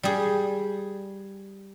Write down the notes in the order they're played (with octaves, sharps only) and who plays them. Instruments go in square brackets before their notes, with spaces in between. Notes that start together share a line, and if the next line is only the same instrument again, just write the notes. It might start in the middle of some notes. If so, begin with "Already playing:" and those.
[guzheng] G3 G#4